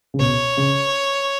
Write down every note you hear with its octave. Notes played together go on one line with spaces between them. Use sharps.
C#3
B2 C#5
C#3